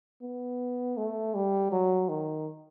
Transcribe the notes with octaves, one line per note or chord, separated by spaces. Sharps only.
B3
A3
G3
F#3
D#3